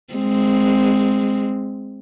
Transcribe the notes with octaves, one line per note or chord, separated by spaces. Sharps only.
G#3 C4